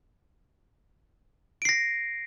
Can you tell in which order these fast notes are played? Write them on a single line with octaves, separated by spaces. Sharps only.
D7 C7 A#6